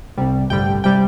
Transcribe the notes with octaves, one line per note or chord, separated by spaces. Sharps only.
C2 C3 G3
A1 G2 D3 G3 G5
C3 G3 G5